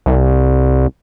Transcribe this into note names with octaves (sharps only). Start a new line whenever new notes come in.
C2